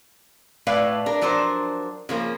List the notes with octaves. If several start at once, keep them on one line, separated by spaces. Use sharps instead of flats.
A2 A3 B4 D5 F5
D4 A#4
F3 F#3 D4 A#4 C5
C#3 F3 A#3